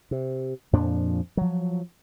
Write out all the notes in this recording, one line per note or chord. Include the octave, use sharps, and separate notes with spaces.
C3
F2 A#2 F3 D4
F3 F#3